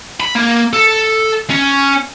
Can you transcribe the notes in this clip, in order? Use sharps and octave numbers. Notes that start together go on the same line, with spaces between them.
B5
A#3
A4
C#4